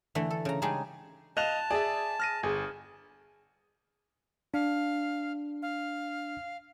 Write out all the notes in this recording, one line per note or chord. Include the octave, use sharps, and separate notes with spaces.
D3 E3 A3
A4
C#3 A#5
C#3 G3 G#3 D4 D#4 G#4
D#5 F5 A5 F#6 E7 F7
G#4 D5 E5
F6 A#6 D#7
G1 G#4
D4 F5
F5